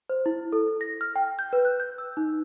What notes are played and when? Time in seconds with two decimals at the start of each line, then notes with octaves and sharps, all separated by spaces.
0.09 C5
0.26 E4
0.53 A4
0.81 A#6
1.01 F6
1.16 G5
1.39 G6
1.53 B4
1.65 F#6
1.80 G6
1.98 E6
2.17 D#4